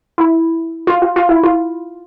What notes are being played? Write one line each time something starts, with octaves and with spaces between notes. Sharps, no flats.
E4
F4
F4
F4
E4
F4